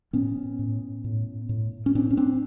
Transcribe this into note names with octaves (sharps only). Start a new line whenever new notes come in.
A2 B3 C#4
A2
A2
A2
C#4
A2 C4 D4
C#4
C4 D4